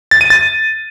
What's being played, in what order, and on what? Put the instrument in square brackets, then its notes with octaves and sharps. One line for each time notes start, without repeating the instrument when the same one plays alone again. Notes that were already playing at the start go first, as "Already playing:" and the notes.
[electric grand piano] A6
D#7
A6